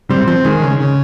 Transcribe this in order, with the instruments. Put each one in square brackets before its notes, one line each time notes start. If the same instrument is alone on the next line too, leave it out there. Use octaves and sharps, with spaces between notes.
[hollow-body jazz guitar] G3 [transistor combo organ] C4
[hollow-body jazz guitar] F3 [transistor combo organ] C4
[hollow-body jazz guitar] D#3 [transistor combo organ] G#3
[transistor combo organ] C#3
C#3